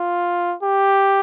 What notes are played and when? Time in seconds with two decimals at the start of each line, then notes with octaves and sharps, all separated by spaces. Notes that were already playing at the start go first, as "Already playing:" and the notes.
Already playing: F4
0.63 G4